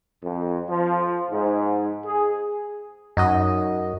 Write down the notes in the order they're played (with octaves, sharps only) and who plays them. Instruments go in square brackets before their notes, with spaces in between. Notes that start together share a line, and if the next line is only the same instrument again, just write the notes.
[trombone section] F2
F3
G#2
G#4
[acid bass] F#2 [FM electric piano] D#4 F#4 D#5